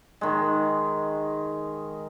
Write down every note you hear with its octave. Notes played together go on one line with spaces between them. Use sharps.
D#3 G#3